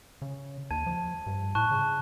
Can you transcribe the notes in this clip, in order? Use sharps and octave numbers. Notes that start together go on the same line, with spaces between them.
C#3
D#2 A5 G#6 D#7
F3
G2
A2 A5 C#6 F#6
C#3